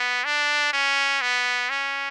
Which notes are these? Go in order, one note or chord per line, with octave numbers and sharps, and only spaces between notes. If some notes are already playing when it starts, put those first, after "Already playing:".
Already playing: B3
D4
C#4
B3
C#4